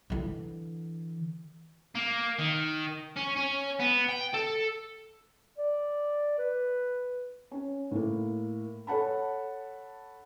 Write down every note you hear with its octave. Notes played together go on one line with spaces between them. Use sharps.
D3 E3
A#3
D#3
C#4
C#4
B3
G5
A4
D5
B4
C#4
A2 A#3
A4 C#5 F#5 A5 B5